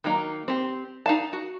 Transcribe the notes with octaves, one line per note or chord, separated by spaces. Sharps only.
D#3 F#3 A#3 D#4
C4 G4
D#4 F5 A5
F#4